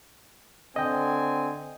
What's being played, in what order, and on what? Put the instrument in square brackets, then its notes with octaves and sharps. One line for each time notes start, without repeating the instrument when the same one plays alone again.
[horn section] D3 C4 G#5 [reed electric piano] D#5 G5